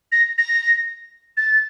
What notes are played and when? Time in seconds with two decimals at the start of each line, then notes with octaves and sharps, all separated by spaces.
0.12 A#6
0.38 A#6
1.37 A6